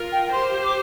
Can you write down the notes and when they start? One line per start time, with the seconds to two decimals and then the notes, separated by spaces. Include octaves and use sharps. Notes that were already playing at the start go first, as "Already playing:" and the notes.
Already playing: F4 A#4
0.12 G5
0.33 G4 C5 C6
0.65 D6